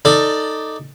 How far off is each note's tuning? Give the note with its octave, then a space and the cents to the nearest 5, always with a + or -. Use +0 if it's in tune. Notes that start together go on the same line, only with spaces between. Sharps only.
D#4 +0 A4 +15 D5 +0